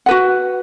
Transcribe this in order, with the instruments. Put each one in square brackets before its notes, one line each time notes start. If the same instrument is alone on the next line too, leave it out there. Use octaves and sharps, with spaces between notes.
[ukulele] F#4 B4 F#5